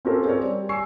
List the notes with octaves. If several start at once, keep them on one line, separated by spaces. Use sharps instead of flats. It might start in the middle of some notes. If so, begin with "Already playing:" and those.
C4 C#4 F4 G4 A4 A#4
C4 G#4 A#4 C#5 D5
G3
G#5 C#6 E6 C7